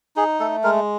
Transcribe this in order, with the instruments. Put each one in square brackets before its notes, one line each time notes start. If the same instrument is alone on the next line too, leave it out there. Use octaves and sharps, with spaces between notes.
[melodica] D#4 G#4
A3 A4
G#3 A#4